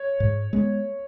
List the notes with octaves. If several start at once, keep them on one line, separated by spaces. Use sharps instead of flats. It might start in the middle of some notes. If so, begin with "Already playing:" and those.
Already playing: C#5
G#2
G#3 B3